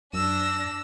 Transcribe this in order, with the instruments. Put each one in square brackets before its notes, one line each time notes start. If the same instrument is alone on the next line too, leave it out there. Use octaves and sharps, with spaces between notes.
[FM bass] F#2 [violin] D4 A#6 [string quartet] E6